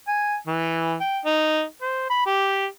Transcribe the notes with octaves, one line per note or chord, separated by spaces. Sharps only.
G#5
E3
G5
D#4
C5
B5
G4